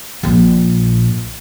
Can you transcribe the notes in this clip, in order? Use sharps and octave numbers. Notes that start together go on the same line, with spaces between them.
A#1 A#2